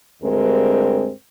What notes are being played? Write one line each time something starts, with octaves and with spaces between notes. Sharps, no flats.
D2 G2 G#3 C4 A#4